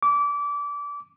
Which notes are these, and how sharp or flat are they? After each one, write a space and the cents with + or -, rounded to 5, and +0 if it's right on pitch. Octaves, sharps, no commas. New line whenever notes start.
D6 -25